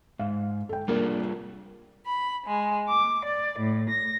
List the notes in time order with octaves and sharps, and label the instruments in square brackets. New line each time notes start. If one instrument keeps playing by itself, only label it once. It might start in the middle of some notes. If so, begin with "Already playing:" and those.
[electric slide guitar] G#2 [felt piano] F5
[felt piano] A4 G5
[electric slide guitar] G3 F4 G#4 [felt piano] A#3 D4 A#4
[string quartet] B5
G#3
D6
D5
A2
A#6